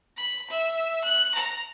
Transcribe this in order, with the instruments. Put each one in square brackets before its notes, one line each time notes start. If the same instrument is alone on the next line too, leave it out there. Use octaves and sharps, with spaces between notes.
[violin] B5
E5
F#6
A#5